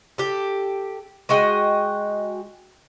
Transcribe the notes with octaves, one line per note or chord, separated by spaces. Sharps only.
G4 A4
G#3 F#4 D#5 G5